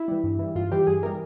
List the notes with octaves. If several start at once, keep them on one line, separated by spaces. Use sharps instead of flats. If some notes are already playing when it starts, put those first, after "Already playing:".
Already playing: E4
E3 G3
G2
E3 G3
G2 F4
E3 G3 G4
G2 G#4
E3 G3 A#4